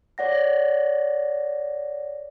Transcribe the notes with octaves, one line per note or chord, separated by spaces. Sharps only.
C#5 D5 F#5 A#6